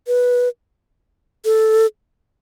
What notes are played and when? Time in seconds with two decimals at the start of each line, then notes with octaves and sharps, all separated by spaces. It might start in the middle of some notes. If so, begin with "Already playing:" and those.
0.07 B4
1.45 A4